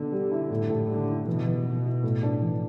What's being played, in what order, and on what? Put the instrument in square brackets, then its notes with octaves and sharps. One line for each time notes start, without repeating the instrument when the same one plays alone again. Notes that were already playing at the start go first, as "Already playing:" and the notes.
Already playing: [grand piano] B2 A4 [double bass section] D3
[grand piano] G3
E4
A2
A2
[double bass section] D3 [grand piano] G3
[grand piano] E4
[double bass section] B2 [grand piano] E3
[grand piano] E3
B3
E4
A2
D4
E3